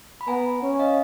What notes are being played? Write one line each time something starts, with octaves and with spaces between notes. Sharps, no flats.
B5
B3 G#5 A#5
C#4
D#5 F5